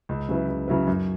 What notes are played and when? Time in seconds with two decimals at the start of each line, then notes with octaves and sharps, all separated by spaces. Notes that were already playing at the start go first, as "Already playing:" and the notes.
0.09 C#2
0.29 C#3 F#3 E4 B4
0.48 C#2
0.68 C#3 F#3 E4 B4
0.87 F#2